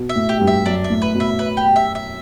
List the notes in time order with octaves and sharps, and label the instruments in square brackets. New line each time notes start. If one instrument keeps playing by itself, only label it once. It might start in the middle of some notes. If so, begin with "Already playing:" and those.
Already playing: [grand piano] B2
[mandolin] E5
[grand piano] A2
[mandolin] G4
[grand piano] G2
[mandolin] E5
[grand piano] F#2 [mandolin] D4
[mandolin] E5
[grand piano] A2
[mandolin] B4
[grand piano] B2
[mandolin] E5
B4
G4
E5
E5